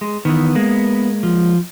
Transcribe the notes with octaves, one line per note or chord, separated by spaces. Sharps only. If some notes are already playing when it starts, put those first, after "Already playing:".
G#3
D#3 E3 B3
G#3 A#3
F3